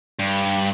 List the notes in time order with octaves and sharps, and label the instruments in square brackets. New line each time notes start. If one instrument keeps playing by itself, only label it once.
[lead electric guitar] G2